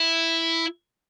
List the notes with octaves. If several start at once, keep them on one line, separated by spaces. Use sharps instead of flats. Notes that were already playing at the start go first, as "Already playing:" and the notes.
Already playing: E4